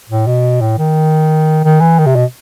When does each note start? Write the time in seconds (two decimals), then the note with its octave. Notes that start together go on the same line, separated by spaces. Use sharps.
0.10 A2
0.27 B2
0.61 A2
0.78 D#3
1.64 D#3
1.80 E3
1.98 D#3
2.06 C3
2.16 B2